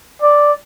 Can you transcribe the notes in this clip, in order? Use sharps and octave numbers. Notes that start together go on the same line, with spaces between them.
D5